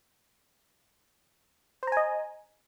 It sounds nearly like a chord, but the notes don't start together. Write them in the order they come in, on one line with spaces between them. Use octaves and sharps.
C5 A#5 G#5 D#5